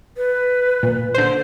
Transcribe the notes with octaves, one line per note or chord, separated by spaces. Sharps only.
B4
A#2
D3 C5